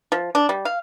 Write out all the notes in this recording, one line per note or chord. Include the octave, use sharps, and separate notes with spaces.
F3
D4
G3
F5